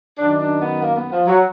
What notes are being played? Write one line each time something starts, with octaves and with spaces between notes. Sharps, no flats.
F#2 D#3 D4
D4
B3
A#3
B3
F3
F#3